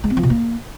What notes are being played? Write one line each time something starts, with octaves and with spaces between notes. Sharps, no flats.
G#3
C4
F3
B2
A#3